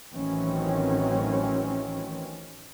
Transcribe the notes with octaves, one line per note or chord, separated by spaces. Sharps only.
A1 D#3 E3 F#3 C4 C#4